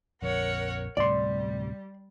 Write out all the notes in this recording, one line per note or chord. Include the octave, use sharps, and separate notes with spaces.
A#1 F2 A#4 C#5 F#5
D2 A2 C3 G3 D5 C6